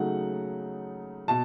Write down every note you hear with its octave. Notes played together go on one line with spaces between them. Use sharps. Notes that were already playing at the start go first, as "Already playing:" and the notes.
Already playing: C#3 F#3 A3 D#4 F#5
B2 A5